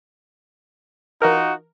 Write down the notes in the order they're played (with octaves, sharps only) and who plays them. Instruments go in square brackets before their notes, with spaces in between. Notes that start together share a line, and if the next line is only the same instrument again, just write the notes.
[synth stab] E3 A#4 [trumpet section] D#4 F4 F#4